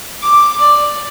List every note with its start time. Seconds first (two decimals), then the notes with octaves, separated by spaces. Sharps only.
0.22 D6
0.61 D5